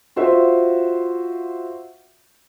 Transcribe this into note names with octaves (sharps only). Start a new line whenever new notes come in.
F4 F#4 C5 E5